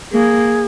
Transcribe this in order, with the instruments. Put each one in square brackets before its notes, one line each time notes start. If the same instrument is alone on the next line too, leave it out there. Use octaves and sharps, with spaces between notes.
[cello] A#3 [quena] G#4